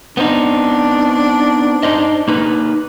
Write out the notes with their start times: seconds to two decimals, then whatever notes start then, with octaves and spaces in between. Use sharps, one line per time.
0.17 B3 C4 D4 D#4
1.83 D#4 C5 D#5
2.28 A#3 D#4 B4